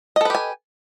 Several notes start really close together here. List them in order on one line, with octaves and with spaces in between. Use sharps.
D#5 A4 B4 G4 G#5